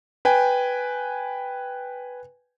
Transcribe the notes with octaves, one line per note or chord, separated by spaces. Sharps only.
B4 G5 G#5